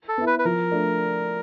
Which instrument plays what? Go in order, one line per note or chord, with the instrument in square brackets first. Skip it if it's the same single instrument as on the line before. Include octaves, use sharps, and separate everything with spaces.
[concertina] A4
[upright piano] B3 E4
[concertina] B4
B4
[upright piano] F3 [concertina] A#4
[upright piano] A3 D4